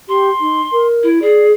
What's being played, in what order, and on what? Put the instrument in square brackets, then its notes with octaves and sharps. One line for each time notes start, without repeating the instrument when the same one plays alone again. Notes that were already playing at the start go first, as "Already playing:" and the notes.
[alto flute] G4 [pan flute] C6
[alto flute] D#4
A#4
[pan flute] E4
[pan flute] G#4 [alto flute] D5